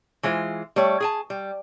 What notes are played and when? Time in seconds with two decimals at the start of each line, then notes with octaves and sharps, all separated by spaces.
0.23 E3 G#3 F4 C5
0.76 G3 A3 C#5
1.00 G#4 G#5 A5
1.30 G3